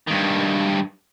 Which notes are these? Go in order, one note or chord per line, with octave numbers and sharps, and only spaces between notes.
G2 D#3